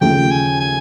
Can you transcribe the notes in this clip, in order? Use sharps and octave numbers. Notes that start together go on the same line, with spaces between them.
D#2 C#3 F3 A3 G5
G#5
G#5